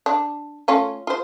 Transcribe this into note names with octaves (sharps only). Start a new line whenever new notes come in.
D4
A3 C#4 F4
F4 C5